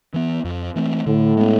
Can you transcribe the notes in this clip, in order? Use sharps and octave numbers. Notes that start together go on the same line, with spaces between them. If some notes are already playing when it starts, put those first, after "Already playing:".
E3 B3
F2
E3 A3 C4
A2 D3
G#3 B3